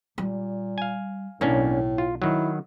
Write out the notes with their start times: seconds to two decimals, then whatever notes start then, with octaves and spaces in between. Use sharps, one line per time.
0.18 A#2 G3
0.78 F5 G#5
1.41 B1 A2 A#3 C#4 D4
1.98 F4
2.22 D#3 F#3 E4